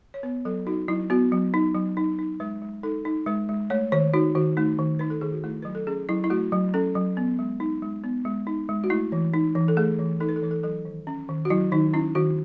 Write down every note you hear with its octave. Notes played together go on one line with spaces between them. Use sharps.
C#5
B3 B4
F#3 A4
D#4 F#4
F#3 E4
B3 F#4
F#3
D#4
F#3
D#4
D#4
G#3 B4
G#3
D#4 A4
D#4
G#3 B4
G#3
A3 C#5
D#3 C#5
D#4 F#4
D#3 F#4
A3 D#4
D#3
D#4 B4
A4
D#3 G#4
F#4
A3 E4
F#3 B4
A4
C#4 G#4
F#3 E4
E4
A3 F#4
F#3
C#4 A4
F#3
B3
G#3
D#4
G#3
B3
G#3
D#4
G#3
F#4
A3 E4
E3
D#4
E3
A4
A3 G#4
E3
D#4 A4
B4
A4
E3 B4
A4
F#3 A4
D#3
C#4
D#3
F#4
F#3 E4
D#3 D#4
C#4 E4
D#3 F#4